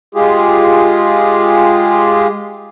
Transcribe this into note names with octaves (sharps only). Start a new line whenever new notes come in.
G#3 F4 G4 G#4